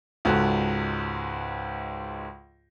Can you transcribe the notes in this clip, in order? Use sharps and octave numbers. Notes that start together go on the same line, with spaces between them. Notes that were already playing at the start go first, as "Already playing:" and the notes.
C#2 G#2 F#4 A4